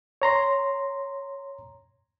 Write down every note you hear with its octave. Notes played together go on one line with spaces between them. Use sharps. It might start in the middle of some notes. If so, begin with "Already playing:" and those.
C#5 A#5 C6